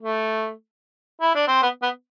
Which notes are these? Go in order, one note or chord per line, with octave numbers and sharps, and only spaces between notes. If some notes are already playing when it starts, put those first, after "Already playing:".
A3
E4
D4
C4
B3
B3